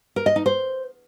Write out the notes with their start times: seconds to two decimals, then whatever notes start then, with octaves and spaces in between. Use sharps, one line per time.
0.16 A#4
0.26 D#5
0.36 D#4
0.46 C5